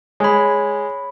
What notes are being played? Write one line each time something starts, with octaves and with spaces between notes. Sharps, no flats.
G#3 C#5 B5